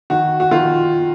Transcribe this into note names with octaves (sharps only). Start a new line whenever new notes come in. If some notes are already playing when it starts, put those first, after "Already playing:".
D#3 F#4
F#4
D#3 F4